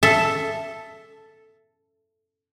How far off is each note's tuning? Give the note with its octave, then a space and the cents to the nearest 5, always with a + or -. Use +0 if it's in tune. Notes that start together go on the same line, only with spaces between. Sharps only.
A4 +0 E5 +10